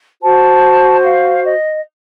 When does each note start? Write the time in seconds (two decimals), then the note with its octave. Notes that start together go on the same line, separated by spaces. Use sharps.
0.22 F#4 C5 A5
1.03 F5
1.44 D#5